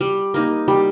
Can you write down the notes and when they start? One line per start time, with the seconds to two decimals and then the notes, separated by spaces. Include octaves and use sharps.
0.01 G3
0.34 A#3 D#4
0.68 G3